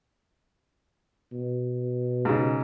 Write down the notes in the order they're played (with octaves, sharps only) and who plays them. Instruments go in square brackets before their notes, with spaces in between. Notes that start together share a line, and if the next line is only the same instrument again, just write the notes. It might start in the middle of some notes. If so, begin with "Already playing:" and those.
[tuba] B2
[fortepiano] G#2 C#3